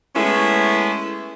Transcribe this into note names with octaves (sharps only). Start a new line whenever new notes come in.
G#3 A3 B3 C#4 E4